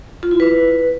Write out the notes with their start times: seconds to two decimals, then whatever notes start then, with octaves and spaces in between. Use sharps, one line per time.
0.23 F4
0.31 E4
0.40 B4